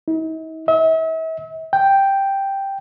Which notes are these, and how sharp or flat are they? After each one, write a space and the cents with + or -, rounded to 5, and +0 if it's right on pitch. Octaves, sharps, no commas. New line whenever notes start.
D#4 +45
E5 -40
G5 +0